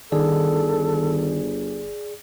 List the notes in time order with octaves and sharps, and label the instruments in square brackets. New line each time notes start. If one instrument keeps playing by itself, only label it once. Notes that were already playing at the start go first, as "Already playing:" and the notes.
[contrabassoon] G1 [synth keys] D#3 [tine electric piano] G#4 D5 [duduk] A4